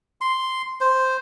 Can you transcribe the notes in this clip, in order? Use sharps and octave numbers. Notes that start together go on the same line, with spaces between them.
C6
C5